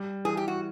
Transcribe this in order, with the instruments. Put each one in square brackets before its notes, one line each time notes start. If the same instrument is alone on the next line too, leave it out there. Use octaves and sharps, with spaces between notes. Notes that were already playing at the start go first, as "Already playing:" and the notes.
Already playing: [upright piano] G3
[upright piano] E3 [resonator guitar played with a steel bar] G#4
[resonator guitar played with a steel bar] G4
F#4